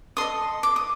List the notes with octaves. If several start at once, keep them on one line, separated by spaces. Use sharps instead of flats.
A4 D#5 C6 D#6
D6
D#6